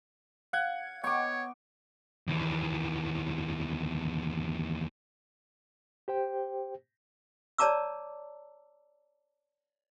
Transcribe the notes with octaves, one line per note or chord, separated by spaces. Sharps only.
F5 F#5 G#6
B3 C#5 D#5 G5 C#6 D6
D#2 E3
G4 C5 G5
C#5 D5 A5 A#5 D6 E6